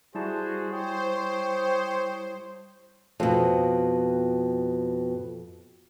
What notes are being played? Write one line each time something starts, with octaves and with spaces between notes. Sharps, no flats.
G3 E4 F#4 G#4 C5 A5
C5 C#5 G5 D#6
F2 B2